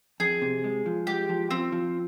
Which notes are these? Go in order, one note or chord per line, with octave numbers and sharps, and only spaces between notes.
F2 G#4
C3
G#3
F3
G#3 G4
F3
F3 C4
F3